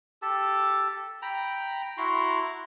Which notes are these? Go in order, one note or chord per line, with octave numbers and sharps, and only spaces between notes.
G4 A4 A5
G5 A#5 B5
E4 F#4 A#5 C6